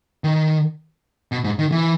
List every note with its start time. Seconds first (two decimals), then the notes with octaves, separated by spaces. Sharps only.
0.24 D#3
1.32 B2
1.44 G#2
1.59 D#3
1.72 E3